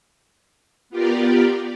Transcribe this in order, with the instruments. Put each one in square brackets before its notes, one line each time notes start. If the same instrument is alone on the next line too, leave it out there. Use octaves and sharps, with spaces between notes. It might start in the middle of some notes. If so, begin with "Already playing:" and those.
[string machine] B3 F4 G4 A#4 D5